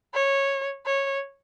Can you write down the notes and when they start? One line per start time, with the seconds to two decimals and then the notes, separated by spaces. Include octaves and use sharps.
0.14 C#5
0.86 C#5